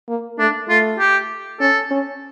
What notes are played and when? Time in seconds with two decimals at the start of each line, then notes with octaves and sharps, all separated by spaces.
0.09 A#3
0.38 A3 D4
0.68 A3 F4
0.99 G4
1.60 C#4 A4
1.91 C#4